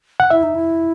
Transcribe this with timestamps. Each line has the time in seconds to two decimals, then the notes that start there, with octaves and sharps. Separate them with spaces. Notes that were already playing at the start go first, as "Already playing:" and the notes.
0.20 F#5
0.30 E4 E5
0.43 D#4
0.55 E4